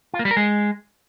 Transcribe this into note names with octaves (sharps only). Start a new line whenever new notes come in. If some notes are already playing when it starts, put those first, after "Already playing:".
F4
A#3
G3
A#4
G#3